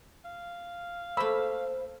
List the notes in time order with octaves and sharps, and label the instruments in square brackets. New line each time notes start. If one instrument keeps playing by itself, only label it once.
[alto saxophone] F5
[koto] A3 A#3 [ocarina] C5 [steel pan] B5 E6